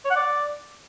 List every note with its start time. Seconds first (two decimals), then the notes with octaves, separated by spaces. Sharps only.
0.05 C#5
0.10 F#5
0.16 D5